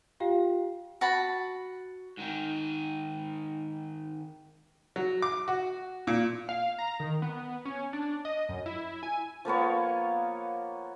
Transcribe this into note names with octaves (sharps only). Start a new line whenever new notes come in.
F4 G4 F5 G5
F#4 A5 B5
G#2 D#3
F#3
D6
F#4
A#2
F5
A#5
D#3
B3
C#4
D4
D#5
F#2
E4
G#5
F3 A#3 B3 C#5